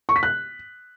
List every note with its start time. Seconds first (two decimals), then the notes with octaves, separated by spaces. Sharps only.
0.09 C#6
0.16 B6
0.23 F#6